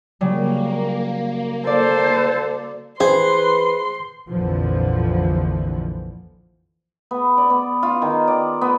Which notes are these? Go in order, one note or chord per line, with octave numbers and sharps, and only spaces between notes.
C#3 F#3 G3 A#3
A4 C5 D5
E3 G#4 B4 C5 C6
A#1 F2 D3 E3 F3
B3
D5
B3
F4
D#3
D5
B3